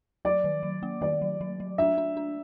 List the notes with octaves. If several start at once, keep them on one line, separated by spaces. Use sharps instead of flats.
F#3 D5
D#3
F#3
A#3
D#3 D5
F#3
F#3
F#3
D4 E5
D4
D4